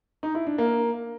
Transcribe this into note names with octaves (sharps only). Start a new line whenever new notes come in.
D#4
E4
D4
A#3